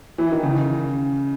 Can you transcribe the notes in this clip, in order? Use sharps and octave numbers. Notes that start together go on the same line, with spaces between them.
E3
D#3
C#3